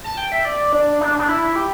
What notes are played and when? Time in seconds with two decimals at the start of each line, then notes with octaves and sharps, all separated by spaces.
0.04 A5
0.17 G5
0.32 E5
0.45 D5
0.73 D4
1.01 D4
1.19 D4
1.28 E4
1.56 G4